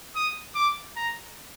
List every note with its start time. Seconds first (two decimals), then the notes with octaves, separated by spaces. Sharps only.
0.16 D#6
0.55 D6
0.96 A#5